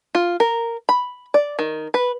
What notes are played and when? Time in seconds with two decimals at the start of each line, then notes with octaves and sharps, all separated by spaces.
0.15 F4
0.40 A#4
0.89 B5
1.34 D5
1.59 D#3
1.94 B4